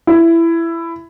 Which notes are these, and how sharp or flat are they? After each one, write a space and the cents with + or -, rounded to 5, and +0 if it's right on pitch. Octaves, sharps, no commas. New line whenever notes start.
E4 +15